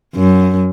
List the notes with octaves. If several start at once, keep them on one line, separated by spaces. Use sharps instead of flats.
F#2